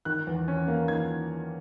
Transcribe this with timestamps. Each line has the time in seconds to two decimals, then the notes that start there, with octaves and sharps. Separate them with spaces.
0.05 D#3 F#6
0.27 E2
0.48 C#4
0.68 A#3
0.88 D#3 G#6